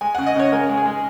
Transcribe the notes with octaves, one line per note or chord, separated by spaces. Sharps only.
G#3 G#5
C#3 F#5
D#5
C#3 C#5
G#3 A#4
G#3
G#4
G#3